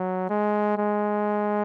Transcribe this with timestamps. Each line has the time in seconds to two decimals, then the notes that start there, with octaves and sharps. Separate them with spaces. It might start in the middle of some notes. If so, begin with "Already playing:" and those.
Already playing: F#3
0.29 G#3
0.78 G#3